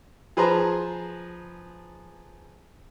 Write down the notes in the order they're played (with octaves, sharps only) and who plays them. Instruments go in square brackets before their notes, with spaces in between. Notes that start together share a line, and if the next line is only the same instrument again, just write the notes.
[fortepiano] F3 G#4 B4 C5 A5 A#5